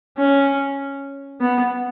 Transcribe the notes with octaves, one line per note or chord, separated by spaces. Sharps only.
C#4
B3